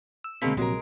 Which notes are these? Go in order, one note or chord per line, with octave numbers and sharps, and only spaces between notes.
E6
D2 B2 G#3 A#3 C4 B6
A#1 C3 F#3 G#3 A#4